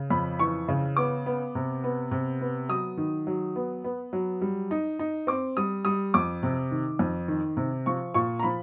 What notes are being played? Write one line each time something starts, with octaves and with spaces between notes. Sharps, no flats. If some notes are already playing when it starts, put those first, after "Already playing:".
Already playing: C#3
F2 B5
E3 C#6
C#3
B3 D6
B3
C3
B3
C3
B3
F#3 D#6
D#3
F#3
B3
B3
F#3
G3
D#4
D#4
C4 D6
G3 D#6
G3 D#6
F2 D6
C3
D#3
F2
D#3
C3
F3 C#6
A#2 C#6
A#5
F3 B5